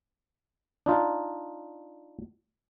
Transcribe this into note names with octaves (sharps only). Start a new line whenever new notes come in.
D4 D#4 F4